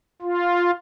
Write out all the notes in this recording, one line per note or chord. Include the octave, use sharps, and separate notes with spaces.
F4